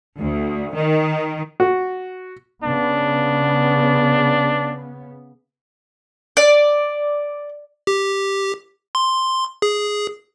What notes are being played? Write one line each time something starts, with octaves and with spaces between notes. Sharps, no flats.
D2
D#3
F#4
C#3 B3 D4
D5
G4
C6
G#4